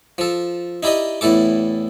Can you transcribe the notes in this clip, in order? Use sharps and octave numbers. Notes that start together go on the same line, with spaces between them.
F3 A4
D#4 E4 G4 D5 D#5
E2 A2 E3 A4 D6